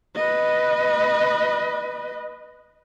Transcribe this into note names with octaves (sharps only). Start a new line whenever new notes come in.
B4 D#5